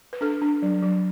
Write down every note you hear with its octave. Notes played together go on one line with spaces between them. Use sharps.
B4
D4 A4
D4
F#3
F#3